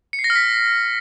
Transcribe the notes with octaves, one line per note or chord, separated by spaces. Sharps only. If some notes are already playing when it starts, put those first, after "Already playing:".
C#7
C7
A#6
F6
B6